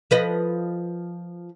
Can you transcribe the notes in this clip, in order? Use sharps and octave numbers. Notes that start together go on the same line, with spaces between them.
F3 B4 D#5